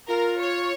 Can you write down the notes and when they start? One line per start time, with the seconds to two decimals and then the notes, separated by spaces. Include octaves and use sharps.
0.08 F4 A#4
0.39 C#5